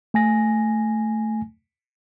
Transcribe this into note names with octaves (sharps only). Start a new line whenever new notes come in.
A3 G#5 A#6